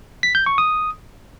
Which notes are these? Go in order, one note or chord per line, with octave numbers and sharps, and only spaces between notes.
B6
G6
C#6
D#6